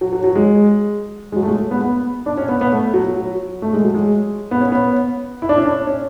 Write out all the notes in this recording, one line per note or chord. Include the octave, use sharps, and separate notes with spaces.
F#3
F#3
F#3
G#3
G#3
F#3
A3
G#3
B3
B3
D4
C#4
B3
B3
A3
F#3
F#3
A3
G#3
F#3
G#3
B3
C#4
B3
E4
D4
C#4
D4
C#4